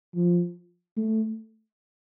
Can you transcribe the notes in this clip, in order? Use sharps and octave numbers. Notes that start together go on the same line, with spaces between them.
F3
A3